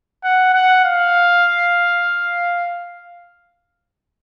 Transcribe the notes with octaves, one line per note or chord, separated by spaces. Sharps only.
F#5
F#5
F5